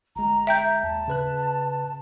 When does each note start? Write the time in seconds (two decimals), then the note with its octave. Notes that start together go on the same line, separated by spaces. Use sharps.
0.16 G1 G#3 A#5
0.47 E5 G5 A#5 G6
0.83 D#2 A5
1.08 C#3 B4 F#6